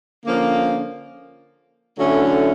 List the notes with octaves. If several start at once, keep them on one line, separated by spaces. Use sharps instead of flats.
D3 F3 A#3 C#4
D3 F#3 A3 C#4 E4